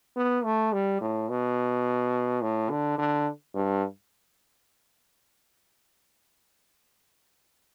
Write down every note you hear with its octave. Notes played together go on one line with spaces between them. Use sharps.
B3
A3
G3
A2
B2
A2
D3
D3
G2